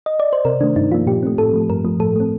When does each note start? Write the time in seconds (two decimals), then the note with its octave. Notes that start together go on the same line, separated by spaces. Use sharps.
0.06 D#5
0.20 D5
0.33 C5
0.45 C3 A#4
0.60 D#3 D4
0.63 A3
0.76 G2 D#4
0.91 F3 F4
0.94 A#3
1.07 A#2 G4
1.23 A3 C4
1.38 A2 A4
1.53 F3 A3
1.69 G2 A#4
1.85 F3 A3
2.00 A2 A4
2.16 A3 C4